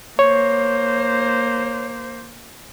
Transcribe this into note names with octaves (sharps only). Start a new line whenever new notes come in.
A#3 C5 C#5